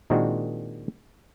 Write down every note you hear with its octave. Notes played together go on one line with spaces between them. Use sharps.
A#2 D#3 G#3 C4 D4 F#4